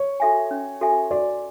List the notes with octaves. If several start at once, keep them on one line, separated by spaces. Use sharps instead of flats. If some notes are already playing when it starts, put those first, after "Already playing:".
Already playing: C#5
F#4 A4 E5 G#5
C#4
F#4 A4 E5 G#5
F#4 D5